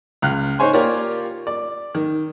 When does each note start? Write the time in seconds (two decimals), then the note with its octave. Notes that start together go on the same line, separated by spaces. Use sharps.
0.22 C#2 F6 F#6
0.59 D#4 C5 C#5 G#5 C6
0.73 A#3 F4 G4 A#4 C#5 D5
1.47 D5
1.95 D#3